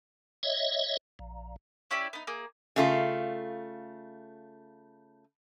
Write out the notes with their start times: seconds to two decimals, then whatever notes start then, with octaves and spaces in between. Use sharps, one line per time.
0.43 C#5 D#5 E5
1.19 A#1
1.91 C#4 E4 G4 D5
2.13 B3 D#4
2.27 A#3 G#4
2.76 C#3 A3 F4